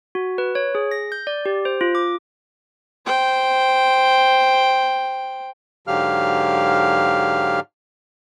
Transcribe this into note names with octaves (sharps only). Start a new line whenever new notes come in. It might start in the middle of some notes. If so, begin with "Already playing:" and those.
F#4
B4
C#5
G#4
A#6
G6
D5
G4
C5
F4
D6
C5 G5
G#2 D3 F#3 G4 F5 F6